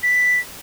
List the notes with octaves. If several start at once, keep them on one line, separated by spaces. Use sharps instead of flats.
B6